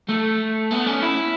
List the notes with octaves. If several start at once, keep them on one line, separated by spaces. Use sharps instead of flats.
A3
B3
C#4
E4